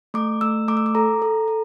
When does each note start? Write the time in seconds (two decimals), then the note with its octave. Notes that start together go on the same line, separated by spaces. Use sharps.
0.14 A3 D6
0.41 A3 E6
0.68 A3 D6
0.77 E6
0.86 D6
0.95 A4 A#5
1.22 A4
1.48 A4